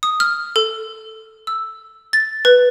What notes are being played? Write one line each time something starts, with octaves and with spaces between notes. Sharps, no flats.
D#6
F6
A4
E6
A6
B4